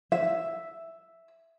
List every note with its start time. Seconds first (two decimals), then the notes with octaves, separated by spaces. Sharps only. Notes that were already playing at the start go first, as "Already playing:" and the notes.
0.12 E5